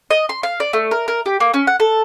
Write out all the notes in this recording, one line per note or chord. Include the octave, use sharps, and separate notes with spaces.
D#5
C6
F5
D5
A3
A#4
A#4
G4
A#3
C#4
F#5
A4